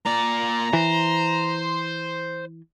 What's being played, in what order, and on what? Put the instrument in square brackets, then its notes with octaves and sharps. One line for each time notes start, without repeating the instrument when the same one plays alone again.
[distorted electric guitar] A#2 D5 [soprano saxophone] A#5
[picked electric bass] E3 [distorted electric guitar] C5